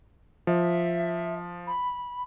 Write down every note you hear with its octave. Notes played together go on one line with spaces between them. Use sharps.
F3 E5
B5